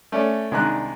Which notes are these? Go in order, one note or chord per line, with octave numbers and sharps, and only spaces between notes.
A3 C#4 D5
C2 D#3 G#3 D4 D#4 F#6